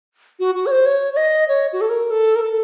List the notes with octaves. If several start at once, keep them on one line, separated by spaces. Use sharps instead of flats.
F#4
F#4
C#5
C5
C#5
C#5
D#5
C#5
F#4
A4
A#4
A4
A#4
A4